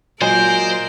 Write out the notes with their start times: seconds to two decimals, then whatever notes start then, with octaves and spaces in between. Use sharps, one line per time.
0.22 A#2 F#3 G#3 F4 A#4 C5 D5 C6